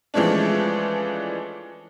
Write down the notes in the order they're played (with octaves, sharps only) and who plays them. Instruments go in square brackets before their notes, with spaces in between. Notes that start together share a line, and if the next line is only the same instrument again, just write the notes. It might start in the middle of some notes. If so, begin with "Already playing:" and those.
[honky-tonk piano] E3 F3 G#3 A3 C#4 D4